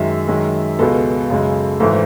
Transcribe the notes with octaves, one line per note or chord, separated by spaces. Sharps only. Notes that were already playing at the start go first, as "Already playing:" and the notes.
Already playing: F#2 D#3 G#3 E5
F#2 D#3 G#3
C#2 B2 G#3 B3 A4
F#2 C#3 G#3
G#1 G#2 E3 A3 A4